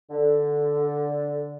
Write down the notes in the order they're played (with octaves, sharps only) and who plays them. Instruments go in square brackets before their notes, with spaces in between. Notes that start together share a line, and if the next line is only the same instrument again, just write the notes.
[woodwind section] D3